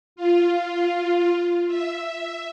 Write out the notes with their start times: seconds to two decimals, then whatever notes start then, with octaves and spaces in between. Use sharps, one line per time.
0.16 F4
1.68 E5